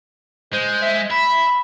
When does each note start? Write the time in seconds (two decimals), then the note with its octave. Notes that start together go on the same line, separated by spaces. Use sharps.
0.53 G#3 C5
0.82 E5
1.11 E5 B5